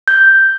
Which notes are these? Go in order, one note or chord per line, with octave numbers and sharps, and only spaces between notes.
G6